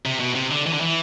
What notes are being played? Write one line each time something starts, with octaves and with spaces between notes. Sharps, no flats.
C3
B2
C3
D3
E3
D3
E3